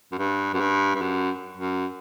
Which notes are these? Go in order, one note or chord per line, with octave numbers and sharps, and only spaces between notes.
F#2
G2
F#2
G2
G2
F#2
F#2